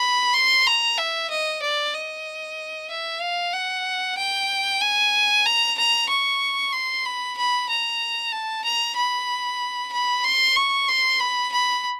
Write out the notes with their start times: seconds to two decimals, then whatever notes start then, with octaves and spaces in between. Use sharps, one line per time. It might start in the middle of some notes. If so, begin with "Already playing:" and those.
Already playing: B5
0.34 C6
0.66 A#5
0.98 E5
1.30 D#5
1.62 D5
1.93 D#5
2.90 E5
3.21 F5
3.53 F#5
4.17 G5
4.81 G#5
5.46 A#5
5.77 A#5
6.09 C#6
6.72 C6
7.05 B5
7.37 B5
7.69 A#5
8.32 A5
8.64 A#5
8.96 B5
9.92 B5
10.24 C6
10.56 C#6
10.89 C6
11.19 B5
11.52 B5